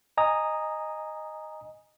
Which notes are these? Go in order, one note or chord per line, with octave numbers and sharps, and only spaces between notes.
D#5 G#5 A#5 D#6